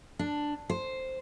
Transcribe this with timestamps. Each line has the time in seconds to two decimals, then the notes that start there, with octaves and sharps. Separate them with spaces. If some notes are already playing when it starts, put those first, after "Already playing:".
0.19 D4
0.70 C5